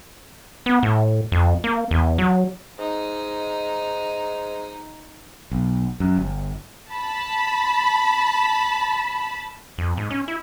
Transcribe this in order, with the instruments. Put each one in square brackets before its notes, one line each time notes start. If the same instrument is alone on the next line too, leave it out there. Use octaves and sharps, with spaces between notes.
[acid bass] B3
A2
F2
A#3
E2
F#3
[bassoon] G#2 [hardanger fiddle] D#4
[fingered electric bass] B1
F#2
G1
[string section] A5 B5
[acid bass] F2
G#2
C#4
E4